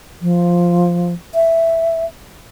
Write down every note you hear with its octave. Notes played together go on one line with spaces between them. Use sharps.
F3
E5